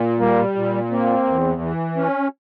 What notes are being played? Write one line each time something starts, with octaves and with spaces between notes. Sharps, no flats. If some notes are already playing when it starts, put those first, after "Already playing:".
Already playing: A#2
G3 A#3
A#2
A#3 C4
E2
E3
C#4